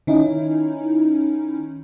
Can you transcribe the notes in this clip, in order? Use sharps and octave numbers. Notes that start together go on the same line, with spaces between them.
D#3 C#4 D#4 E4